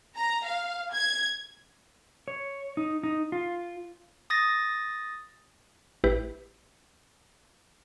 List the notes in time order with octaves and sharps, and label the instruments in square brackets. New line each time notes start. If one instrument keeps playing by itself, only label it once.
[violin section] A#5
F5
G#6
[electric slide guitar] C#5
D#4
D#4
F4
[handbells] D#6 A6 A#6
[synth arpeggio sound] A1 E4 G4 B4